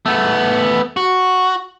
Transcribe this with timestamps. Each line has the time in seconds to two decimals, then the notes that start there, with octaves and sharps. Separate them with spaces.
0.06 A3 B3
0.97 F#4